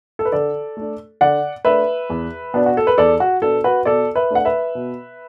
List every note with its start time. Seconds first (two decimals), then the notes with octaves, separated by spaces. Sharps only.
0.19 A4
0.25 B4
0.32 D3 A4 D5
0.77 A3 D4
1.21 D3 D5 F#5
1.65 A3 D4 B4 E5
2.10 E2
2.54 B2 B3 D4
2.66 F#4
2.77 A4
2.87 B4
2.98 E2 A4 D5
3.20 F#4
3.42 B2 B3 D4 A4
3.64 F#4 B4
3.85 B2 A4 D5
4.15 B4 E5
4.31 A3 D4 F#5
4.45 B4 E5
4.75 B2